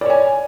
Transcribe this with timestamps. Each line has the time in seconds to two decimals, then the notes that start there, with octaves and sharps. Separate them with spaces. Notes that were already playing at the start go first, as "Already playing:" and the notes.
0.01 D5
0.06 C#5
0.10 G#5